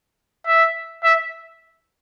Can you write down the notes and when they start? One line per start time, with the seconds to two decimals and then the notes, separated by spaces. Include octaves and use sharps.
0.47 E5
1.04 E5